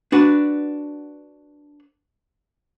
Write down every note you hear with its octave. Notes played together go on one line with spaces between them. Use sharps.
D4 F#4 B4